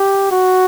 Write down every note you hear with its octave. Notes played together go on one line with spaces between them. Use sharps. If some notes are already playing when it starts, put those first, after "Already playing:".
Already playing: G4
F#4